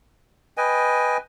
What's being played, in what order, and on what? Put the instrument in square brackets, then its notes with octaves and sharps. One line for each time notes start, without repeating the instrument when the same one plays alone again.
[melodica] B4 D#5 G5 G#5